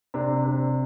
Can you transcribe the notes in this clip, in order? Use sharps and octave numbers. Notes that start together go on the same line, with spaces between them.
C3 D4
C3